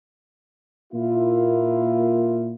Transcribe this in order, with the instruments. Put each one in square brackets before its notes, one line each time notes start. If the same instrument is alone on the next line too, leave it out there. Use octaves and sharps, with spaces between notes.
[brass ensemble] A#2 A#3 E4 F4